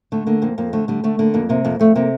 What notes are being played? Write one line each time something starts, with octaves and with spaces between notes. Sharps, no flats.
D3 A3
D3 A#3
F2 A#3
F2 A#3
D3 A3
D3 G3
D3 A3
D3 A#3
F2 A#3
C3 A#3
F2 A#3
F2 A3
C3 A#3